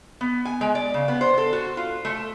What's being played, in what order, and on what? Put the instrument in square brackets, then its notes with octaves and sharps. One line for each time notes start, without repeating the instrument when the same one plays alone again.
[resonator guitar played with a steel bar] B3
G#5
G#3
D5
C#3
B3
C5
A4
F#4
F4
A3